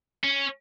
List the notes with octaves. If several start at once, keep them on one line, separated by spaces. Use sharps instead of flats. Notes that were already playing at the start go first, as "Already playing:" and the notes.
C#4